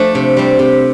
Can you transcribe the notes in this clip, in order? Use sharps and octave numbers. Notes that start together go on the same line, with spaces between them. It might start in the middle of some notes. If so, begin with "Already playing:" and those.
Already playing: F3 A3 D4
C3
G3 C4
C3